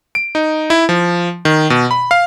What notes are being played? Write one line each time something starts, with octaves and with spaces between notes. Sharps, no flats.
D7
D#4
E4
F3
D#3
B2
B5
F5